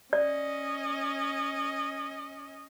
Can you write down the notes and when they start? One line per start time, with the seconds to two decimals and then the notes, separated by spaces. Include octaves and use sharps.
0.13 C#4 D5 D#5